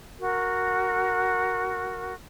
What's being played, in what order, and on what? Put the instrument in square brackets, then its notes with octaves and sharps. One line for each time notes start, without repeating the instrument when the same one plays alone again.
[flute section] F#4 A#4